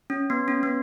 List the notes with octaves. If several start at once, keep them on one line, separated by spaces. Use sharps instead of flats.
C#4
B3
C#4
B3